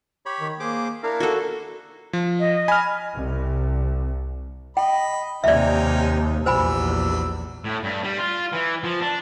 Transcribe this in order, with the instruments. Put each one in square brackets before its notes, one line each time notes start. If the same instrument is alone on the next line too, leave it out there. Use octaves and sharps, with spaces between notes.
[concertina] G4 C#5 B5
[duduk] D#3
[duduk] A#3 [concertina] G#4 C5 D6
[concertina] D4 E4 F5 [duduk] A#4
[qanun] F#4 A4
[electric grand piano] F3
[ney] D#5
[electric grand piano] G#5 [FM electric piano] B5 F6
[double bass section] C2
[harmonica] D#5 B5 [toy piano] G5
[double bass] D#2 C3 [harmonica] C#4 D#4 G5 [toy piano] D5 E5
[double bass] A#1 E2 [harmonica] F#3 G3 E6 [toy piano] C5 G#5 B5
[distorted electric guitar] A2
G2
G3
F4
E3
F3
D4